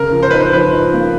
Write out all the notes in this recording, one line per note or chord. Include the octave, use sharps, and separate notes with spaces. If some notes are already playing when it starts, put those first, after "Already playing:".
Already playing: C#3 A#4
F3
C5
D#4 B4
C5
F3 B4
D#4
A#3